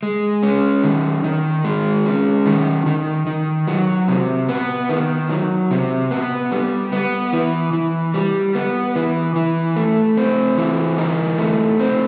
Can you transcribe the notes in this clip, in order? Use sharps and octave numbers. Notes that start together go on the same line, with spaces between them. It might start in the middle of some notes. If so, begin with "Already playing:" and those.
G#3
C#4
D#3
D#3
G#3
C#4
D#3
D#3
D#3
F#3
C3
B3
D#3
F#3
C3
B3
G3
B3
E3
E3
G3
B3
E3
E3
A3
C4
E3
D#4
A3
C4